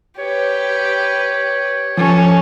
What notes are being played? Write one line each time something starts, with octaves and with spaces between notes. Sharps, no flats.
G4 B4 C#5
F3 C#4 A4